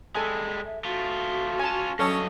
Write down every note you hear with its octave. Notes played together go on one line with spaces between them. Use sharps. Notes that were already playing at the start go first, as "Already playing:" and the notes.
G3 G#3 A4 G#5
E5
A3 F4 F#4
C#4 F4 G#5 A5
G2 F#3 C#4 A4 D#5